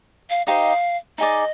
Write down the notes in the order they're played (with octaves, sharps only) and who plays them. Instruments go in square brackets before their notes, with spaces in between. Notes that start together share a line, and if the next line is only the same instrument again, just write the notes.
[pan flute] F5
[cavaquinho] D#4 G4 C5 D#5 [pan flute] F5
[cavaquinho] D#4 G#4 D5 [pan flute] D#5